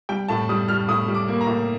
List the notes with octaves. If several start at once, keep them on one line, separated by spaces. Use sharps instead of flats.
G3 G5
A2 A5
G3 D#6
G3 F6
A2 D#6
G3
D6
A#3
A#5
A2